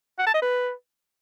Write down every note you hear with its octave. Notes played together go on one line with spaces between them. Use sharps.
F#5
A5
D#5
B4